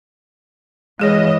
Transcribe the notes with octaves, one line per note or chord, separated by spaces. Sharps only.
E3 G#3 G#4 C#5 D#5